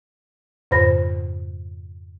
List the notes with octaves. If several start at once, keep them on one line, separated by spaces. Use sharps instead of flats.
F2 G#2 C#3 C5 B5 A#6